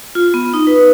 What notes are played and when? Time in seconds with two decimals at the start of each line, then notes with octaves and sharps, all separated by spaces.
0.15 F4
0.34 B3
0.54 D#4
0.67 B4